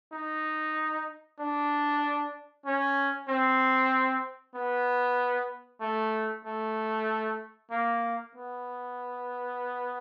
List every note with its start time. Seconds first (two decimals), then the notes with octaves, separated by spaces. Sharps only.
0.12 D#4
1.40 D4
2.66 C#4
3.28 C4
4.55 B3
5.81 A3
6.45 A3
7.71 A#3
8.35 B3